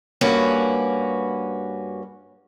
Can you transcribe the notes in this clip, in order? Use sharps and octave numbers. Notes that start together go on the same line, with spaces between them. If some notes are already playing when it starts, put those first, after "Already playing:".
G2 A#3 C#4 F#4 B4